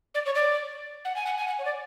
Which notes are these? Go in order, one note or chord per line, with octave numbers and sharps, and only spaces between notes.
D5
C#5
D5
F#5
G#5
F#5
G#5
F#5
C#5
D5